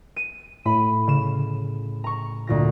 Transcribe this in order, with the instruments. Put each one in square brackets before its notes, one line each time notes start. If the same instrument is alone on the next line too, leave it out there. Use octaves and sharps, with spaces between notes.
[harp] D#7
[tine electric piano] A2 [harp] B5
[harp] C#3 E7
A#5 C#6
D2 A#2 A#6